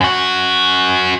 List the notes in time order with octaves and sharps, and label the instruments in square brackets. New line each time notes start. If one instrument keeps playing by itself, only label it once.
[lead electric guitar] F#2 F#4